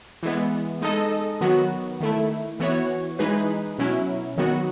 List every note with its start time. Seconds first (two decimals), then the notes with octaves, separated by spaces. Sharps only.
0.23 E3 G#3 B3
0.82 G#3 D#4 A4 D#5
1.41 D#3 F#3 B3 F#4
2.00 D#3 A3 E4
2.60 E3 B3 F#4 C#5
3.19 E3 G#3 D#4 G#4 B4
3.78 B2 F#3 C#4 E4
4.37 D#3 F#3 B3 F#4